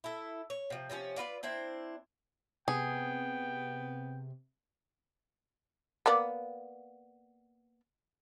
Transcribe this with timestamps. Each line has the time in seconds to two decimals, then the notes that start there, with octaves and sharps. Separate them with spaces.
0.04 E4 A4
0.50 C#5
0.70 C3 F3
0.90 C3 F3 A#3 C#4
1.16 D4 F4 B4 D5
1.43 C4 D4 E4 C5
2.68 C3 B3 G#4 G5
6.06 A#3 B3 D5